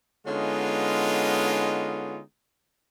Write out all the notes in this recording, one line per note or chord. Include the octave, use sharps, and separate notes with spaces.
D3 G#3 B3 C#4 D#4 F4